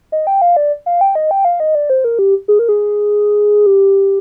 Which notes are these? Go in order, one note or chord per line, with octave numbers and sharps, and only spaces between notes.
D#5
G5
F5
D5
F5
G5
D#5
G5
F5
D#5
D5
C5
A#4
G4
G#4
A#4
G#4
G4